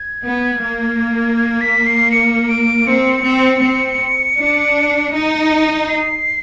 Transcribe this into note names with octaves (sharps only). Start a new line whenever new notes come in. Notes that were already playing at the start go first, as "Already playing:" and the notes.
Already playing: G#6
B3
A#3
G#6
B6
C7
C#7
D7
C4 C#7
C4
C4
D4
D#4
C7